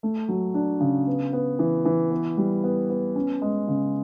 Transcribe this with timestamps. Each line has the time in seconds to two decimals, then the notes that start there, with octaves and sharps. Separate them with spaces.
0.03 A3
0.28 F#3
0.54 D4
0.80 C#3
1.08 B3
1.33 B3
1.59 E3
1.85 E3
2.11 B3
2.37 G3
2.64 B3
2.90 B3
3.16 C#4
3.42 G#3
3.68 C#3